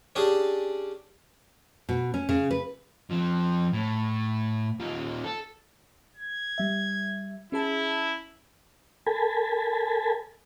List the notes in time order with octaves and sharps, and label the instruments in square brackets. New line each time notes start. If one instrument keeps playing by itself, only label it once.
[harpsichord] C#4 D4 G4 G#4 D5
[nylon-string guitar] B2
C#4
C#3
B4
[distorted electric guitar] F3 C4
A2
D#2 F4
A4
[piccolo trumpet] G#6
[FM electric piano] G3 E5
[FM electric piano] C#4 G#4 A5 [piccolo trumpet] E4
[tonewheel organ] A4 A#4 G#5 A5 B5